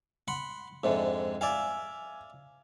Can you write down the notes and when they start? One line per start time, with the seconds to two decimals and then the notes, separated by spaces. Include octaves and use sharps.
0.28 F#5 B5 C6
0.84 F2 G#2 D3 E5
1.41 D5 E5 F5 G#5